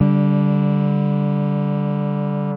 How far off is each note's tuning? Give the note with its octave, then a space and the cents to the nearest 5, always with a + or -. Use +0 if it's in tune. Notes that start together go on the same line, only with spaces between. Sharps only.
D3 -20 G3 +0